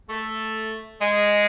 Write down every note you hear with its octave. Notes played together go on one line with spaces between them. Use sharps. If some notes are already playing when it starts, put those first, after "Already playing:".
A3
G#3